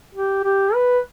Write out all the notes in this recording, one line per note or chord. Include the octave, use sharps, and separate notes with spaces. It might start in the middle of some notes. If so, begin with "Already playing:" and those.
G4
G4
B4